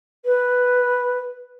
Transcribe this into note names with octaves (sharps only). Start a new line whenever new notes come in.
B4